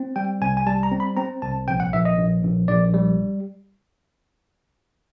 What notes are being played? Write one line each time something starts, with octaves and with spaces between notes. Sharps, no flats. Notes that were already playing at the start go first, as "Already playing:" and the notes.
Already playing: C4
G3 G5
C2 G#5
G#5
G3 A5
A#5
C4
B5
C4 A#5
C2 A5
A#1 G5
F#5
A#1 E5
D#5
A#1
A#1
A#1 D5
G3